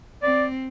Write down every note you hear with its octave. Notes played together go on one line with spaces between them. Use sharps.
C4 D5